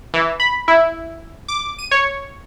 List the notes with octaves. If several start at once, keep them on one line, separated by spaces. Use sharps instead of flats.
E3
B5
E4
D6
D#7
C#5